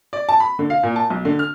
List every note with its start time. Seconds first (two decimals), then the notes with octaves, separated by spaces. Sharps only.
0.13 D5
0.29 A5
0.40 B5
0.59 D3
0.70 F5
0.83 A#2
0.96 A5
1.10 B1
1.25 D3
1.39 F6